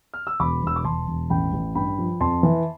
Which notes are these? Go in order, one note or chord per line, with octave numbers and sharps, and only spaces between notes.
F6
E6
E1 B5 D6
E1 E6
D6
E1 A5 C6
E1
A1 G5 B5
A1
G2 G5 B5
F3
F2 A5 C6
E3